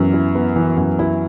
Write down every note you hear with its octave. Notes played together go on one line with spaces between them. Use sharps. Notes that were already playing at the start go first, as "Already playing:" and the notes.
Already playing: F#2 E3 B3
E4
B3
E3
F#2
E4